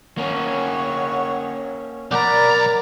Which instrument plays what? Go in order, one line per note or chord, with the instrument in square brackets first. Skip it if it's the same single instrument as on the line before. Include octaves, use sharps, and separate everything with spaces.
[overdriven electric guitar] A#3 C#4 [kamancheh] C#5 F#5
[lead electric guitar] B1 A#5 [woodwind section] A#4 D5 [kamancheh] F#5 B5